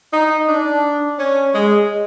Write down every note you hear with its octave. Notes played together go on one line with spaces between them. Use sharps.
D#4
D4
C#4
G#3